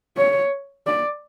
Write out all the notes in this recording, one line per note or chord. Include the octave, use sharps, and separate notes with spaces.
C#5
D5